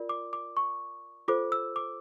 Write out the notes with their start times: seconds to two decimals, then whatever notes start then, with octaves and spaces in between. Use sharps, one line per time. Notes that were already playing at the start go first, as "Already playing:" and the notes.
Already playing: F4 A#4 D5
0.09 D6
0.33 D6
0.57 C#6
1.28 F4 A4 C5 D6
1.52 E6
1.76 D6